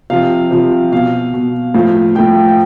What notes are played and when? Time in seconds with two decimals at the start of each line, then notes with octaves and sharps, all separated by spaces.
0.10 C3 F3 F5
0.51 C3 F3
0.92 B2 F5
1.34 B2
1.74 A2 F3 F5
2.15 A2 F3 G5
2.49 G5